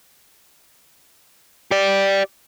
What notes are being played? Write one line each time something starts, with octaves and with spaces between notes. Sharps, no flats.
G4 D5